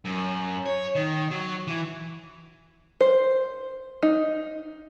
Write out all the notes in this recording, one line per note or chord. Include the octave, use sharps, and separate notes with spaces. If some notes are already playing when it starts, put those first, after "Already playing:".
F#2
C#5
D#3
F#3
E3
C5
D#4